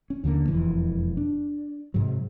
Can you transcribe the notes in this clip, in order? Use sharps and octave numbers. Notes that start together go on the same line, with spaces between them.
C#4
D#2 D3 D#3 A#3
E1 F2 E3
D4
G#2 C3 F#3